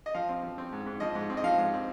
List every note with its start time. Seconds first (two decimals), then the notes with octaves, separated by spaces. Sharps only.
0.06 D#5
0.14 F3 F5
0.29 C4
0.43 F3
0.58 C4
0.72 G#2
0.86 G#2
1.00 F3 D#5
1.15 G#2
1.30 C4
1.37 D#5
1.44 F3 F5
1.58 G#2
1.74 C4